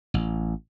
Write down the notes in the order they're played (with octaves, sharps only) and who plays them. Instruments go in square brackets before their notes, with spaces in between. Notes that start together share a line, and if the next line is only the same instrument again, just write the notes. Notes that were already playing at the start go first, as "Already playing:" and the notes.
[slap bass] A1